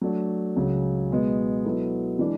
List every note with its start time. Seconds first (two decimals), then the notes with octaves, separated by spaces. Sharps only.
0.01 F#3 A3 D4
0.56 C#2 C#3 F#3 C#4
1.10 B2 G#3 B3
1.64 B2 F#3 B3 E4 A4
2.19 E3 G#3 D4